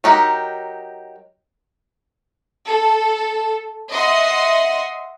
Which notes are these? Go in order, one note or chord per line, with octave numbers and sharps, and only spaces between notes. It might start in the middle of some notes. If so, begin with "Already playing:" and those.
F#3 D#4 G4 A#4
A4
D#5 E5 F#5 C6